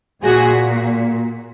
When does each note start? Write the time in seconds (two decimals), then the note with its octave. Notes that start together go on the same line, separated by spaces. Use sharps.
0.23 A#2 F#4 G#4